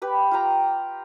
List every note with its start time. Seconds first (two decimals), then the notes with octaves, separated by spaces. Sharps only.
0.02 G4 B4 B5
0.31 F4 G4 G5 A#5